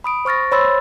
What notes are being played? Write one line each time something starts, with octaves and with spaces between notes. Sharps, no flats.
B5 D#6 D7
C5 C#6 F6 A6 A#6
C5 C#5 B5 C6 E6 A6